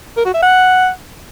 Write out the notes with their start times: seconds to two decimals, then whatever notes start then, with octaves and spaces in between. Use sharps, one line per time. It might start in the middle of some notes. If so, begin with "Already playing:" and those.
0.17 A#4
0.25 F#4
0.34 E5
0.42 F#5